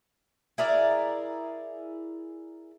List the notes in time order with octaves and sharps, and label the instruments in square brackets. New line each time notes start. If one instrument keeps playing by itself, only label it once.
[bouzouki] E4 G#4 A#4 D5